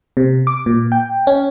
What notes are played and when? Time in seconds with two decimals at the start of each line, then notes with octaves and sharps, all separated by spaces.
0.17 C3
0.47 D6
0.66 A#2
0.92 G5
1.27 C#4